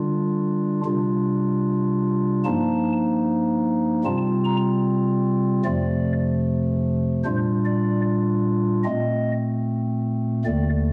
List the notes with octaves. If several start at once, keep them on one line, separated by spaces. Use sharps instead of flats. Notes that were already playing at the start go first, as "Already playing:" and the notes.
Already playing: D3 G3 D4 F4
C3 G3 D4 F4
G2 F3 A#3 D#4 A5
C3 G3 C4 F4 A5
A#5
F2 C3 F3 A3 D5
A#2 G3 D4 F4 C5
D5
A#2 A3 C4 D#5
D#2 D3 A3 D5